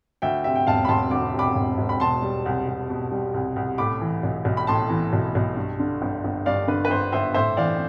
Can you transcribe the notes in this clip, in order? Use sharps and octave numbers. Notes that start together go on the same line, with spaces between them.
D2 E5 G5
C3 E5 G5
G5
E1 F5 A5
B5
E1 A5 C6
D2 D6
C3 B5 D6
E1
E1
B5
B2 A5 C6
G3
C2
C2
B2
G3
C2
C2
A2 B5 D6
E3
B1
B1
B5
A2 A5 C6
E3
B1
B1
G2
D3
G1
G1
G2 D5 F5
D3 B4
B4
G1 C5
G1 C5 E5
A2 C5 E5
E3 D5 F5